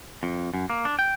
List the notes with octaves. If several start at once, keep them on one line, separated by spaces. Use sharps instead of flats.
F2
F#2
A#3
D4
G5